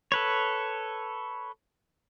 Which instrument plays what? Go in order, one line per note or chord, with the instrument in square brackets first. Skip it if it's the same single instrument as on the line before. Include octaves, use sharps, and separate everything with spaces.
[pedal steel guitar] A4 B4 C#5